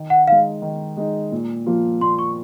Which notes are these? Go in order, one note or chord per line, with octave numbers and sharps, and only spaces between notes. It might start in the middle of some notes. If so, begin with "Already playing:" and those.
Already playing: D#3
F#5
G#3 D#4 F5
D#3
G#3 D#4
A#2
F3 A#3 F4
A#2 C6
C#6